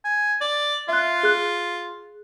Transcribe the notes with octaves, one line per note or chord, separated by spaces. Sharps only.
G#5
D5
F4 E5 F#6
G#4 F#6